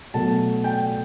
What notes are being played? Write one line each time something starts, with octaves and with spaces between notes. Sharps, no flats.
B2 F#3 A3 A5
G5